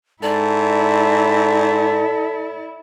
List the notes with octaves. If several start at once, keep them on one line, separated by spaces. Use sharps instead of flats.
G#2 E4 A4 D5